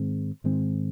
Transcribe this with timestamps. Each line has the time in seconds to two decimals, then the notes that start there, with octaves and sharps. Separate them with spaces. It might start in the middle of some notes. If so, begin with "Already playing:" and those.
Already playing: G#2 D#3 G#3 C4
0.44 G#2 D#3 G#3 C4